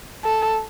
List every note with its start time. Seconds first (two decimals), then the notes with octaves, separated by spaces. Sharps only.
0.24 A4